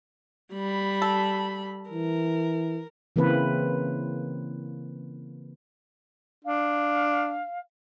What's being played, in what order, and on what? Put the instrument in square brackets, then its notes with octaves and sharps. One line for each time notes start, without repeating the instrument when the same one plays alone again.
[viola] G3 B5
[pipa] A4
[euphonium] E3 [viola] A#4
[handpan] C#3 E3 A#3 C4 B4
[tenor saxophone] D4 [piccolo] F5